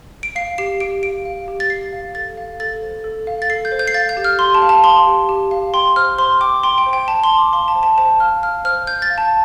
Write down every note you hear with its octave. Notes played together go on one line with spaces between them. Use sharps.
D7
F5 C7
G4 C7
G4 D7
F5 D7
F5
G4
A6
G4 C7
F5
A4 A6
F5
A4 A6
C5
A4
F5
A6
A4 C7
G6
C5
G6
C7
F5 A6
G6
G4
F6
G4 C6
A5
F5
A5
F5 C6
G4
G4
F5
G5 C6
C5 F6
C5 C6
G5 D6
G5 C6
G5
C5
G5
C5 A5
C6
G5
D6
F5 C6
A5
C5
A5
C5 A5
F5 F6
F5 F6
C5 F6
C5 G6
A6
F5
A5